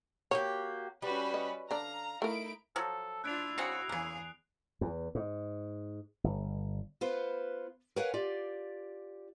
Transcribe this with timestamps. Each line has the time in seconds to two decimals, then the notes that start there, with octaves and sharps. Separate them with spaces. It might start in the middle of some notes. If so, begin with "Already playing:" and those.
0.31 A#3 F#4 G4 C#5
1.02 G3 C#4 F#4 B4
1.34 D#5
1.71 D3 D4 F5 A#5
2.22 A3 D#4 E4 A#4 D7
2.76 F3 F#3 A4
3.24 D4 E4 F4 F#6 D7 F7
3.58 C#3 C4 F#4 F#5 D#6 C7
3.89 E2 C#3 A#3 G#4
4.81 E2
5.15 G#2
6.24 G1
7.01 B3 F4 B4 C5
7.96 A#4 B4 C#5 F5 F#5 G#5
8.14 F4 G4 D5